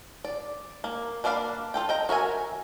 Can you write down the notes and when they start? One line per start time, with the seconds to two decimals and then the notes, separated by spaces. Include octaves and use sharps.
0.25 D5
0.84 A#3
1.24 A#3 D4 D5 F5 B5
1.74 F4 A4 G5
1.89 D#5 G5 A#5
2.09 F#4 A#4 E5 G#5